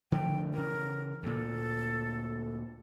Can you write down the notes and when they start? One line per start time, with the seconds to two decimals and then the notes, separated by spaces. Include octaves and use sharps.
0.12 D3 F3 A3 G5
0.53 C#3 E3 A#4
1.23 D2 A#2 A4